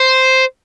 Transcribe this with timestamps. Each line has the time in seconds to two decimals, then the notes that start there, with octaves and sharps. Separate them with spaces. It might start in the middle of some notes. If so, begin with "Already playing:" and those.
Already playing: C5